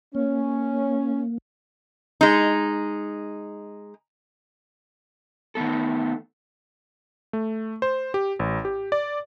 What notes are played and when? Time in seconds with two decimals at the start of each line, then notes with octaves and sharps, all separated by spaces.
0.15 A#3 C#4
2.21 G#3 D#4
5.55 D#3 A3 B3 A4
7.33 A3
7.82 C5
8.14 G4
8.39 A1
8.65 G4
8.92 D5